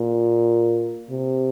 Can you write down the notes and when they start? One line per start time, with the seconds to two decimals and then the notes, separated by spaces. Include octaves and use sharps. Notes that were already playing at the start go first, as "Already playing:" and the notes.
Already playing: A#2
1.10 C3